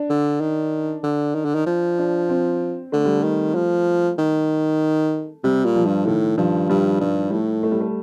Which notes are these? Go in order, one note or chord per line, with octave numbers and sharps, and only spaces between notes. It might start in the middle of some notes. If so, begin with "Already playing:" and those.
Already playing: D4
D3
D#3
D3
D#3
D3
D#3
F3
D4
C4
D3 A3
G3
D#3 A3
F3
D#3
C3 G3
A#2
F3
G2
A2 D#3
G2 F3
G2 G3
G2 G3
A2 A3
A3
G3
A3